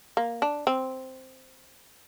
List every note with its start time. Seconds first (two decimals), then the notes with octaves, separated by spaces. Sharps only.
0.17 A#3
0.42 D4
0.67 C4